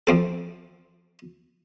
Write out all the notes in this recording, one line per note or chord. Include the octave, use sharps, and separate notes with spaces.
F2 C4 A4